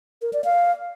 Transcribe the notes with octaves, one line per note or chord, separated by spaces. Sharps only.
A#4
D5
F5